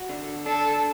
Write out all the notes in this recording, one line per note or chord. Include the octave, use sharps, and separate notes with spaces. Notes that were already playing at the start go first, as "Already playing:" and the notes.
Already playing: F#4
D3
D4 A4